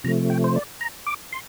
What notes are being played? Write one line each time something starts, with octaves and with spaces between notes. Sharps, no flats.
C3 F3 A3 A#5
G5
C5
D5
A#5
D6
C6